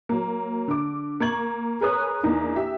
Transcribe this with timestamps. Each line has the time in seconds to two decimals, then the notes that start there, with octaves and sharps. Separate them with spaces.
0.09 F#3 A#3
0.68 D3 D6
1.20 A#3 C#6 G#6 F#7
1.81 G#4 A#4 B4 C#5 D#6 F#6
2.23 E2 A#3 D4 D#4
2.56 G4 E5